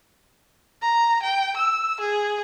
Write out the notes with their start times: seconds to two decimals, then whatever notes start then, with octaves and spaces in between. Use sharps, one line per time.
0.82 A#5
1.23 G5
1.57 E6
2.01 G#4